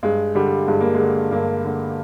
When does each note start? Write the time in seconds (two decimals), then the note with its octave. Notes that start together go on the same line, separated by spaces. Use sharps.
0.03 G2 G#3
0.35 D3 G3
0.67 G2 G#3
0.81 A#3
0.95 D3 G#3
1.31 G2 A#3
1.64 D3